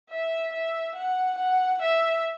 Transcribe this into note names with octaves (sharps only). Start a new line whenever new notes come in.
E5
E5
F#5
F#5
E5